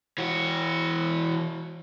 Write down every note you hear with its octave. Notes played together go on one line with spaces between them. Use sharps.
E3 F#4